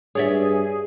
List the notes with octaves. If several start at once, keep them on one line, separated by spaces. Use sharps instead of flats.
G2 G#4 C#5 D5 E5